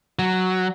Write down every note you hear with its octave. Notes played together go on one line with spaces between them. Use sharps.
F#3